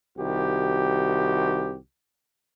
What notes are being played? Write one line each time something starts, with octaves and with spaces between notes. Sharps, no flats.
C2 D#3 F#4 G4